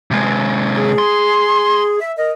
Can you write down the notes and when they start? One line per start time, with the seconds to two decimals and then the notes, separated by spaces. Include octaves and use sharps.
0.11 C3 G#3
0.75 G#4
0.99 C6
2.00 E5
2.17 A#4 D#5